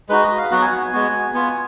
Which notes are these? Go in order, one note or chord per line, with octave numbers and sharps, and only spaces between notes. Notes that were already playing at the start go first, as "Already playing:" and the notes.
G#3 D#4 F#4 B4
D#5
F5
F#3 B3 F#4 F#5
G#5
F#5
G#5
G#3 B3 F#4
B3 F4 G#5